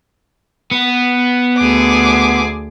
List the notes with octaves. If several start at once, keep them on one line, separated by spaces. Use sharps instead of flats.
B3
D2 G#4 D6